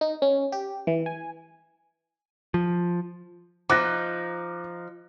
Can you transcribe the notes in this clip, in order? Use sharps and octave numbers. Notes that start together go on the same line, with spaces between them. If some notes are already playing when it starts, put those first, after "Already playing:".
D#4
C#4
G4
E3
G#5
F3
F3 D#4 D6 F#6 A#6